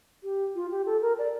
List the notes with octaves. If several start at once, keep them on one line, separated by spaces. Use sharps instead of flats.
G4
F4
G4
A4
A#4
D5